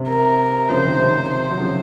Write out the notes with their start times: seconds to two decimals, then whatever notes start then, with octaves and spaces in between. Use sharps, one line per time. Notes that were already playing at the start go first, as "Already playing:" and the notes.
Already playing: C3
0.09 A#4
0.69 C#3 F3 C5
0.85 C3 D#3
0.99 C3 D#3
1.30 C5
1.51 F#3
1.60 C#3 F3